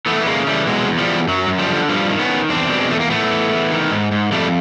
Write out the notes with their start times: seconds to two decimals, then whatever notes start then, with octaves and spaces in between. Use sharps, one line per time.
0.06 E3 A3 B3
0.21 B3
0.26 C#3 G#3 A#3
0.47 E3 G3 A3
0.67 B2 F#3 G#3
0.88 E2
0.98 F3 G3
1.07 E2
1.28 F#2 F#3
1.48 F#2
1.59 F3 G3
1.69 D3
1.89 G2 F3 G3
2.10 D#3
2.19 B3 C#4
2.29 D#3
2.49 E2 C4 D4
2.70 B2 G3
2.80 G#3
2.90 E2 A3
3.00 A#3
3.10 A2 A3 B3
3.31 E3
3.51 E3
3.71 D#3
3.91 G#2
4.12 G#2
4.32 F2 G3 A3